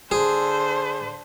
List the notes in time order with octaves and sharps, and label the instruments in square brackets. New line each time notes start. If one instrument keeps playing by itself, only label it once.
[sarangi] D3 [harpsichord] G#4 [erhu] C5